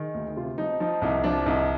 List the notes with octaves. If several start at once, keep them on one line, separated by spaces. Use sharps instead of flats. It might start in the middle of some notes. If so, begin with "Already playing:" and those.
Already playing: D#3 G#4
D2
C3 F4
F3 D#4
F3 D#4
C2 D#4
F3 D4
C2 D#4